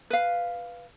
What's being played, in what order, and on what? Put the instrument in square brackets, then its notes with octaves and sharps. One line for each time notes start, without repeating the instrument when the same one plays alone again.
[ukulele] B4 F5